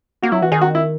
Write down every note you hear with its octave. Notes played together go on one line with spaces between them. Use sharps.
A#3 F#4
F#3 E4
E3 F#4
D#3 G#4
F#4
E4